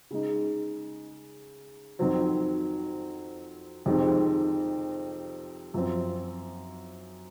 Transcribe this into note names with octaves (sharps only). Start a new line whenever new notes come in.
C#3 G#3 D#4
F2 D#3 F#3 C4
F2 C3 D#3 G#3 C4
F#2 F3 C4